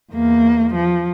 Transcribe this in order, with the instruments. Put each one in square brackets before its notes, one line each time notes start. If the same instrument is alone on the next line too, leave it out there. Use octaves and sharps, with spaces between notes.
[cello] E2 A#3
F3